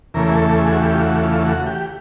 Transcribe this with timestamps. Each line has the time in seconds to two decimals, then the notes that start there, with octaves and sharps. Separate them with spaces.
0.14 E2 C#3 E3 A3 A#4
0.28 G#4
0.36 A4
0.58 G#4
0.72 F#4
0.80 G4
0.93 F4
1.01 F#4
1.23 F4
1.45 F#4
1.66 G4